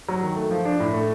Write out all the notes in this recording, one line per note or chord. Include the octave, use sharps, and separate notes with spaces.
F#3
D#3
A3
F3
D4
A2
A3